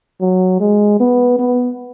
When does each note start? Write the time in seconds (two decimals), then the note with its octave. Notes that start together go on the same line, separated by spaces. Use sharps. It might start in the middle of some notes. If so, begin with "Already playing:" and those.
0.21 F#3
0.60 G#3
1.00 B3
1.39 B3